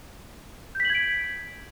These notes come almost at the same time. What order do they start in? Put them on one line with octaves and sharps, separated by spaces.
G6 B6 F#7 G#6 D7